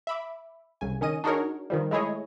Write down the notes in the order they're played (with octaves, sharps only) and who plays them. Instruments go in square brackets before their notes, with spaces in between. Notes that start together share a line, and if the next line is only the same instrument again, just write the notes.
[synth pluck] E5 B5 D6
C2 C#3 G#5
D#3 C#4 D#5 D#7
D4 D#4 F#4 G#4 A#4 C#5
D#3 F3 G3
G#3 A3 E4 G#4 C#5 D#5